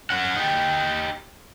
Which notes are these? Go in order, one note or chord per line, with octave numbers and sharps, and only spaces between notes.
C#4 F#5
D#4 G4